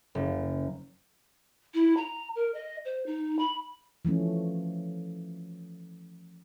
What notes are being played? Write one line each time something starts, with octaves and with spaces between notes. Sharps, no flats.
F#1
E4
A#5
A#4
D#5
C5
D#4
B5
E3 F3 A3 C#4